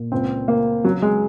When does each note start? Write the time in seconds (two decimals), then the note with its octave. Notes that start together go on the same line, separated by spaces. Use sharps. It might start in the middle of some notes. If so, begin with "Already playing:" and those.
Already playing: A#2
0.12 C#2 C4
0.48 C#3 A#3
0.84 C#3 F#3
1.02 G#3